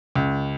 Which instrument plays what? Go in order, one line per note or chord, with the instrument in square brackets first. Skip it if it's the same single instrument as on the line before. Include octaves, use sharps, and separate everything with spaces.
[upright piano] C#2